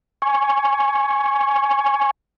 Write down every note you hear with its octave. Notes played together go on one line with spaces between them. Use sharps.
G#5 C#6